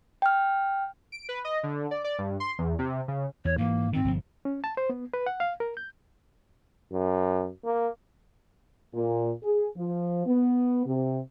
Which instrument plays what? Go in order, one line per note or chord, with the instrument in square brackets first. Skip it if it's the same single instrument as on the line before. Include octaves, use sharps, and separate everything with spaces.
[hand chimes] G5 F6
[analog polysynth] D7
B4
D#5
D3
D5
D5
G2
C6
E2
C3
C#3
[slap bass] E2 [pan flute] C#5
[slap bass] G#2 E3 [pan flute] A#3
[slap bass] G#2 D#3 [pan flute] C4
[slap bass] G1 C3 F3
[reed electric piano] C#4
A5
C5
B3
B4
F#5
F5
A#4
G6
[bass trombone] F#2
A#3
[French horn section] A#2
G#4
F3
B3
C3